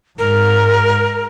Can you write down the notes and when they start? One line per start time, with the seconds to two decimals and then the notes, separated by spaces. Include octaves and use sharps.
0.19 G#2 A#4